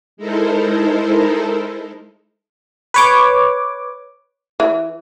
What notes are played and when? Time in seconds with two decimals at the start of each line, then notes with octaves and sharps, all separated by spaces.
0.17 G#3 D#4 E4 A4 A#4 C5
2.94 B4 C#5 D6
4.60 E3